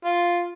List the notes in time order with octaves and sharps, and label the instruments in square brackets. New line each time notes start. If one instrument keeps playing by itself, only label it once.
[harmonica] F4